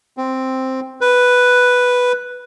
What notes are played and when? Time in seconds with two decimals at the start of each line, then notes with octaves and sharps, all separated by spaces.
0.17 C4
1.01 B4